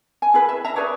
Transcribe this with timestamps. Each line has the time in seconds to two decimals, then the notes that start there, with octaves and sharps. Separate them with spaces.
0.22 G#5
0.34 E4 G#4 B4
0.49 E5
0.65 E5 A#5
0.76 G#4 B4 C#5 D5